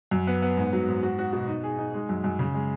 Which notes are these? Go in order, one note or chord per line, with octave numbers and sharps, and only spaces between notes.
F#2
B3
B3
G#2
F#3
G#2
F#4
F#4
B2
D#4
G#4
D#4
G#3
F#2
F#2
C#3
G#3